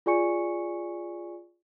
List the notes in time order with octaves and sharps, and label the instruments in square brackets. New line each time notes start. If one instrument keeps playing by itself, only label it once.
[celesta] F4 G#4 D5 G#5 C#6 C#7